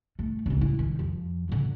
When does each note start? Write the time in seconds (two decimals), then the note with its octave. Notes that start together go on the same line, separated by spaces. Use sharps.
0.19 A3
0.46 E1 C#2
0.61 E4
0.79 D#3
0.99 F2 F3
1.49 A#2 D3